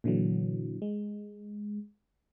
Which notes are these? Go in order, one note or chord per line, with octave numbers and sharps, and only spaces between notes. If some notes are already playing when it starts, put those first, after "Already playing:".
A#2 D3 E3 F#3
G#3